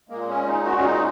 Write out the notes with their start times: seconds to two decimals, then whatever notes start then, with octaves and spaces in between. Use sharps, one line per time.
0.09 A#2 G#3 A#3
0.29 C#4
0.48 D#4
0.66 F#4
0.78 C#4
0.85 D#4